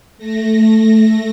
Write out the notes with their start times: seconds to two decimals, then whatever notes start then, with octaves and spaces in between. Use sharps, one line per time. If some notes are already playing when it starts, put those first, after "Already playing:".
0.18 A3 A#6